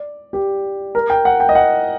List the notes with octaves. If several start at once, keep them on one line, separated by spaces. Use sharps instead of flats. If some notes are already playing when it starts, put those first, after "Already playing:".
Already playing: D5
G4
A#4
G5
F#5
G5
D#5
F#5